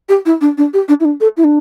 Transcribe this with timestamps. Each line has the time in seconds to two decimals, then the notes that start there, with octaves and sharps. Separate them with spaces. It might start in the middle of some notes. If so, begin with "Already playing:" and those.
0.09 G4
0.26 E4
0.41 D4
0.58 D4
0.73 G4
0.88 D4
1.00 E4
1.05 D4
1.20 A4
1.37 E4
1.44 D4